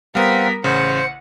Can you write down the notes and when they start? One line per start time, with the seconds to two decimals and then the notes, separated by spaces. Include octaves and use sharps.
0.15 G3 B3 C4 A#4 F5 F#5 B6
0.64 A1 C#3 C5 F#5 C#7